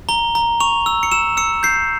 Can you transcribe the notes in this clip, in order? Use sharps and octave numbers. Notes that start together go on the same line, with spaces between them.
A#5 G7
A#5
C#6 F7
E6
C#7
E6 E7
E6 C#7
G6 C7